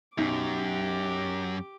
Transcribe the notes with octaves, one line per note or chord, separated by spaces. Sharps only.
B1 F#2 G4 D6